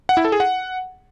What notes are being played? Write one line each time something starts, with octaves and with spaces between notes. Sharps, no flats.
F#5
E4
A4
G#4
F#5